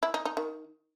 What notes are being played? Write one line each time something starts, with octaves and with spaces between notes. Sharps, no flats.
E4
D#4
D#4
D#3